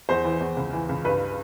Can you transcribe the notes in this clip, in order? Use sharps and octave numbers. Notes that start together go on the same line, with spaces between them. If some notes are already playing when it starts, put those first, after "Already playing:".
E2 C5
E3
E2
C#2
E3
C#2
G2 B4